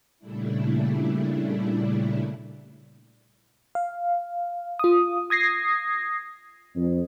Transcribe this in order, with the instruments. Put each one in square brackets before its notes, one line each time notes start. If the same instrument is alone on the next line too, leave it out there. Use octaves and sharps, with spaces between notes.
[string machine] A#2 C#3 G3 A3 D4 E4
[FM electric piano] F5
F4 D#6
D#6 G#6 A#6 C7
[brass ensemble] F2